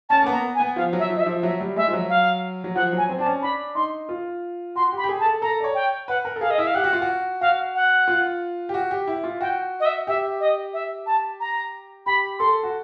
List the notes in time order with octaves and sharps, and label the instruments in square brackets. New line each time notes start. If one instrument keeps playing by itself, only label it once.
[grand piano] C#4 [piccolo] A5
[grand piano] A#3
B3
[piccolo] A#5
G#5
[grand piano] B3
[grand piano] F3 [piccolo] F5
[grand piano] F#3
[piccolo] E5
[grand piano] F3
[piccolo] D#5
E5
[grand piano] F3
[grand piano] F#3 [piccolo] E5
[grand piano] G3
[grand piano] G#3 [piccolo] E5
[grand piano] F3
F#3
[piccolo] F5
[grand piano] F#3
[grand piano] F3 [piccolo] F#5
[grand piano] F#3 [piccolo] G#5
[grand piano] C4
[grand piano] D4 [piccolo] A5
[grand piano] C#4
[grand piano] D4 [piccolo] B5
[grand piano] D#4 [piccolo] C6
[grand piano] F4
[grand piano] F#4 [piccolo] C6
[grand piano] G4
[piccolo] B5
[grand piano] G4
G#4
[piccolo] A5
[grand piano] A4
[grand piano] A4 [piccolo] A#5
[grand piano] D5
C#5
[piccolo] G5
[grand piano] B4 [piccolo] F#5
[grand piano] A#4
A4
[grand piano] G#4 [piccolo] F5
[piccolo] D#5
[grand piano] E4 [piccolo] E5
[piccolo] F5
[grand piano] G4 [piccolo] F#5
[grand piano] F#4
F4
F#4
[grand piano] F#4 [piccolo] F5
[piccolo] F#5
[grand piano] F4
G4
F#4
G4
E4
F4
[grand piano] F#4 [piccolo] G5
[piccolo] D#5
E5
[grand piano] G4 [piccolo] E5
[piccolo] D#5
E5
A5
A#5
[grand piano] G4 [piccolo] B5
[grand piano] A4 [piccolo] C6
[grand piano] F#4